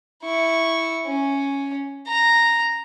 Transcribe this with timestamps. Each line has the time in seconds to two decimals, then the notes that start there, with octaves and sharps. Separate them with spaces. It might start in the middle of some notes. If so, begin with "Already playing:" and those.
0.24 E4 C#6
1.07 C#4
2.08 A#5